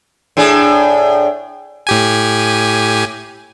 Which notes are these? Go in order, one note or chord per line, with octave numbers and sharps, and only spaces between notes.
A2 D4 G#4
A2 G4 G#5